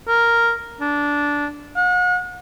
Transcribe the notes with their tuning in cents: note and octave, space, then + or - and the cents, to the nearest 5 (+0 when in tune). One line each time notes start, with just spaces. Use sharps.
A#4 +0
D4 -15
F#5 -40